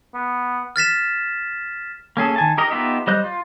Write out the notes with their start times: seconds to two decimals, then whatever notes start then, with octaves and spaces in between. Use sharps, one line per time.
0.14 B3
0.76 F6 A6 B6 E7
2.17 A#3 C#4 G#4 A4
2.36 D#3 G#5 A5
2.58 D#4 G4 A#4 D#5
2.71 B3 D#4 F4 G4 E5
3.07 G3 C5 D#5 F#6 G6
3.24 F4